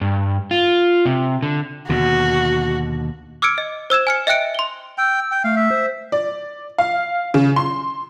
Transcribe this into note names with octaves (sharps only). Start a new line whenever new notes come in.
G2
F4
C3
D3
D#2 B2 D3 F#4
D6 E6 F6 G#6 C#7 D7
D#5
C5 E6 G#6 E7
G#5 F6 C#7
D#5 E5 G5 F#6 C#7 D7
C6 G7
G5 E6
G5
A3 F5
E5
C5
D5
F5
C#3
C6